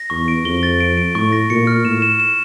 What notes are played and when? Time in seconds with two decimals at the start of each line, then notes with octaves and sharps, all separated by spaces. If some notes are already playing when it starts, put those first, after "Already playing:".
Already playing: A#6
0.10 E2 C#6
0.28 D7
0.45 F2 G7
0.63 A6
0.80 D7
0.97 D7
1.15 A2 C#6
1.32 A#6
1.50 A#2 C#7
1.67 F6
1.84 A2 E7
2.02 E7
2.20 E7